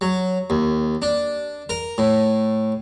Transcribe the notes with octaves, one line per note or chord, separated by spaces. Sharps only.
F#3
D#2
D4
A#4
A2